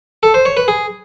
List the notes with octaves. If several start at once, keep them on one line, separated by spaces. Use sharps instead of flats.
A4
C5
C#5
B4
G#4